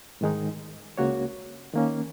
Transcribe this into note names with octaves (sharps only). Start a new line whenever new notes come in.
G#2 D#3 G#3 D#4
C#2 C#3 A#3 F#4 C#5
D#3 A#3 C#4